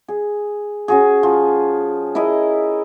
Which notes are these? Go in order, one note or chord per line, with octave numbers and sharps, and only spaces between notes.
G#4
C#4 F#4 G#4
F3
E4 G#4 A#4 D#5